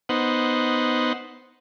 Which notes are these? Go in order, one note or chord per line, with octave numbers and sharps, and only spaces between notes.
B3 D#4 C5 F#5